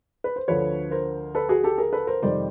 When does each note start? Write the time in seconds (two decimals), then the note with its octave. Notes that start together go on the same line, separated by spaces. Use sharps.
0.24 B4
0.36 C5
0.48 D2 D3 F3 B4 C#5
0.91 A#4 C5
1.35 A4 B4
1.49 F#4 G#4
1.64 G4 A4
1.78 G#4 A#4
1.93 A4 B4
2.07 A#4 C5
2.22 F2 C3 D#3 G3 C5 D5